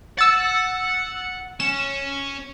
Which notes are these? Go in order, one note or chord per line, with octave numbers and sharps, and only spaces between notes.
F#5 E6 A6
C#4 E7